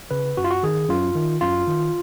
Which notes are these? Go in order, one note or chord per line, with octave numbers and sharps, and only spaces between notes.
C#3 B4
F#2 F#4
F4
F#4
D#3 G#4
F#2 F4
D#3
F#2 F4
D#3